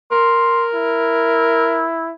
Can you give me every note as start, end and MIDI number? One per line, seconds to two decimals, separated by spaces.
0.12 1.87 70
0.12 0.65 84
0.75 2.12 64